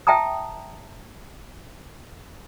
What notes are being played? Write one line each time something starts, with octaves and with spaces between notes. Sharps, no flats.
E5 G5 A5 A#5 D#6